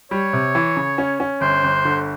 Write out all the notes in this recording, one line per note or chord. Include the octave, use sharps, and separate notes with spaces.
G3 C#5
C3
E3
C#3
C#4
C#4
G1 C5
G1
D3